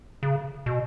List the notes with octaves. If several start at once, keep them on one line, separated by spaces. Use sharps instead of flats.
C#3
B2